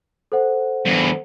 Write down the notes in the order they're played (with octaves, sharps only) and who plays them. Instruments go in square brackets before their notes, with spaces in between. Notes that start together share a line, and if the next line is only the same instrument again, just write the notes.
[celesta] A4 C5 F#5
[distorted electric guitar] E2 G2